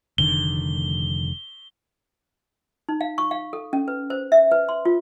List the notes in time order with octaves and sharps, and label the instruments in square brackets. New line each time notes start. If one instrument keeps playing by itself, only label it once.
[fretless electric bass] F1 D3 D#3 [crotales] G7
[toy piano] D#4
F5
C#6
F5
A4
C#4
B4
C5
E5
B4
C6
F4